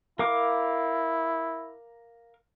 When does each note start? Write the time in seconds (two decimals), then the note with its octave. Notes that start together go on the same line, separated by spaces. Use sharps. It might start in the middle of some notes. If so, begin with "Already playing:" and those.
0.19 E4 A#4 F5 D6